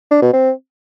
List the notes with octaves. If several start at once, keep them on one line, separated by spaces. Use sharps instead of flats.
D4
B2
C4